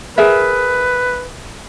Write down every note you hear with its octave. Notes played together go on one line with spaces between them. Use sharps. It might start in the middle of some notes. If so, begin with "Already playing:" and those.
G#4 A#4 B4 E5